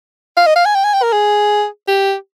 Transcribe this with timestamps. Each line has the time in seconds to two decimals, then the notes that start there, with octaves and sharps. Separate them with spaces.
0.37 F5
0.46 D#5
0.56 F5
0.65 G#5
0.75 G5
0.84 G#5
0.94 G5
1.03 A#4
1.13 G#4
1.88 G4